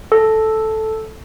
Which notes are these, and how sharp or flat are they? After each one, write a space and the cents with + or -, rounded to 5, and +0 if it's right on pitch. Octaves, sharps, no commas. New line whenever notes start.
A4 -5